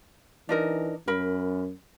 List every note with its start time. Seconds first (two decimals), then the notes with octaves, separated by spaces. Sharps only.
0.49 E3 D4 D#4 A#4
1.08 F#2 A#4 B5